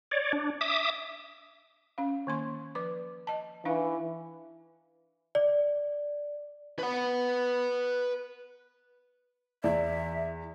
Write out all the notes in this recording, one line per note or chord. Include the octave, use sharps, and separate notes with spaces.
C#5 D5
D4
E5 D6 D#6
C#4 F5
D#3 A#3 C6
F3 B4 D6
D#5 A5
E3 D4 D#4 F5
D5
B4 F#5
E2 D5 E5